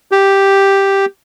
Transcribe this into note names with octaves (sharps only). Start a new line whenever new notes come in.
G4